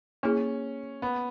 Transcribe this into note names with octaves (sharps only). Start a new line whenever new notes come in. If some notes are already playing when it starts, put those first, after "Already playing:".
A#3 C#4 E4 G#4
B3